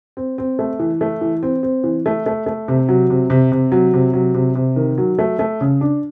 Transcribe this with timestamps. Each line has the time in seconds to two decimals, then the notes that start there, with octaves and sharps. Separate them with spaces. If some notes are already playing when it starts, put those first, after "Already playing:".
0.17 C4
0.38 C4
0.59 A3
0.79 E3
1.01 A3
1.21 E3
1.43 C4
1.63 C4
1.84 E3
2.06 A3
2.26 A3
2.46 A3
2.68 C3
2.89 F#3
3.10 C3
3.30 C3
3.52 C3
3.72 F#3
3.94 C3
4.13 F#3
4.34 C3
4.55 C3
4.76 D#3
4.98 F#3
5.19 A3
5.39 A3
5.61 C#3
5.81 D4